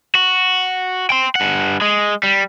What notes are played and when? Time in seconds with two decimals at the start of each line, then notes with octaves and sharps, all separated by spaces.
0.15 F#4
1.10 G5 C6
1.35 G2 F#5
1.81 G#3
2.23 G3